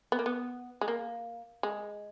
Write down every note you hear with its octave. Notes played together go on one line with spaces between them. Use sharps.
B3
A#3
B3
G#3
A#3
G#3